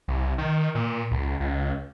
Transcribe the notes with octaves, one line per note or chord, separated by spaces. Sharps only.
C2
D#3
A#2
C#2
C#2